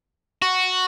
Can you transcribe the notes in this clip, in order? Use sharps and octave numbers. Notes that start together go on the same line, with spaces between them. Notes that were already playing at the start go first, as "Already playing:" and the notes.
F#4